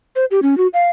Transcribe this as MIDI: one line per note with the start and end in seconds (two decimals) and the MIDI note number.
0.16 0.25 72
0.31 0.40 67
0.42 0.57 61
0.58 0.67 66
0.74 0.91 77